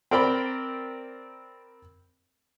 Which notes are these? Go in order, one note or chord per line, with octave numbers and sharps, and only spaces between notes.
C4 A#4 D5 G5 B5